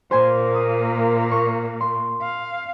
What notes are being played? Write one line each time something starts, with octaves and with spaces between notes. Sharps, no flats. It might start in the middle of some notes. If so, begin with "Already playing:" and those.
A#2 A#3 C5 G#5 C6
D#6
C#6
C6
F5